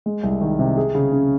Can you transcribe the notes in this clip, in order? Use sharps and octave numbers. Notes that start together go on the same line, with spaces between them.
G#3
C2
D#3
C3
G#4
C#3
C#4